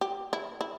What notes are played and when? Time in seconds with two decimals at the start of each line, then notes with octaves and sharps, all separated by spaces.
0.01 G4
0.33 E4
0.61 E4